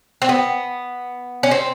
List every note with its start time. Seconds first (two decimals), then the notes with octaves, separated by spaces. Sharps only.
0.22 C4
0.29 B3
1.43 C#4
1.51 C4